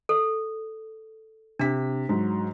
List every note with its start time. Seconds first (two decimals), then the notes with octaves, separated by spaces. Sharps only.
0.09 A4
1.59 C3 D4 B6
2.09 G#2 F#3